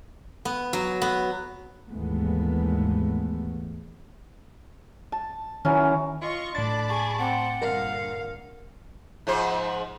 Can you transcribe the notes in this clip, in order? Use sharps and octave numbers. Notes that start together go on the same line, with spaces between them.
B3
F#3
B3
D#2 G#2 E3 G#3 A3 B3
A5
D#3 E3 F#3 C#4
F4 D#5 C#6
A2 D4 A5 B5 D6 A6
G#4 C#6
C4 F#5
G2 A#2 D3 A#4 F5
G#2 F3 C5